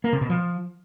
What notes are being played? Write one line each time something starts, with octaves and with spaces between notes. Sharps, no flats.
A#3
C3
B2
F3